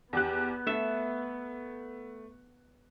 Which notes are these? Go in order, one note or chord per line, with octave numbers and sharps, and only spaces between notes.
E2 B3 G4 F#6
A3 A4 E5